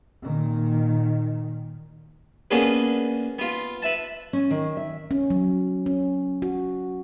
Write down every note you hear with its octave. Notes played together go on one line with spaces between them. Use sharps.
A#2 D#3
A#3 B3 C#4 D4 G#4 B4
B3 F4
B4 E5 A5
C#4
D#3
E5
C#4
F#3
C#4
F#4